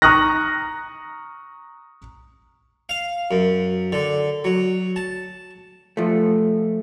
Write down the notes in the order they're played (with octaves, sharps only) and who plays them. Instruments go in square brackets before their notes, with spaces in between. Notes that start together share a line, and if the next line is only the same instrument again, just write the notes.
[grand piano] A#5 C#6 D#6 F6 F#6 A#6
[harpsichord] F5
F#2
D3
F#3
A5
[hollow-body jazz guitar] F3 A3